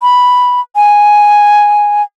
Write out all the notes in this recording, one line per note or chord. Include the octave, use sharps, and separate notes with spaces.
B5
G#5